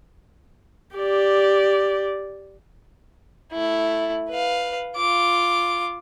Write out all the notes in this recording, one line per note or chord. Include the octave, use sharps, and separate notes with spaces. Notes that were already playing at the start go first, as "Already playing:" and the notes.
G4 D5
A3 E4
B4 F5
F4 D6